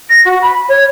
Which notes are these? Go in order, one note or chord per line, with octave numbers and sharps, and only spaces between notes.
A#6
F#4
B5
C#5